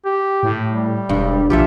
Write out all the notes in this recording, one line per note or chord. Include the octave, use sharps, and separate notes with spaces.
G4
A2
G3
E1 G2
A#1 F4 G4 A4 E5